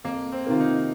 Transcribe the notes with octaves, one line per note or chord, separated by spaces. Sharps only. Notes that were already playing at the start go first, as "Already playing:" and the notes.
F2 A#3
C4
C3 D#3 A#3 F4
D#4